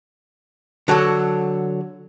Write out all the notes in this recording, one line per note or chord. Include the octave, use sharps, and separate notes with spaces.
D3 F#3 F#4 A4